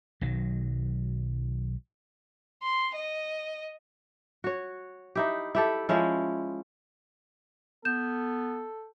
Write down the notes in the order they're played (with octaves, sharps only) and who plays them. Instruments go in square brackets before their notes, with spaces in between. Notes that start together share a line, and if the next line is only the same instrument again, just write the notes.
[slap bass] B1 D#3 F#3
[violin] C6
D#5
[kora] F#4 C#5
D#4 E4 G4
E4 G4 A4
F3 G#3 C#4 E4
[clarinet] B3 [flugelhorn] A4 [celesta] G6 E7